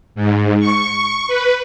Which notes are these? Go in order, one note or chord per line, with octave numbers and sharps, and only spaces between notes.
G#2
C#6
B4